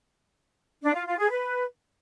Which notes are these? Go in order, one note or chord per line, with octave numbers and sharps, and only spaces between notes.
D4
F4
F4
G#4
B4